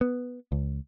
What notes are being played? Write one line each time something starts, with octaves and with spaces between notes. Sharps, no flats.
B3
C#2